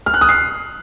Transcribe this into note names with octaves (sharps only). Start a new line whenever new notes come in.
F6
F#6
D#6
C7